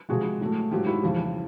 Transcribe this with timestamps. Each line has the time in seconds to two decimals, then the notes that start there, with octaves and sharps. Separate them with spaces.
0.09 C3 F3 G#3 F#4 G#4
0.41 A2 F#3 A3
0.71 G#2 D#3 F#3 F4 G4
0.87 E4 F#4
1.03 F2 C#3 E3 G3